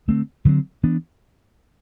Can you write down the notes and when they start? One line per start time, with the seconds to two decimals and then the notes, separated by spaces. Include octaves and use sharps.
0.08 D3 A3 C4
0.45 D3 F#3 C4
0.83 E3 B3 D4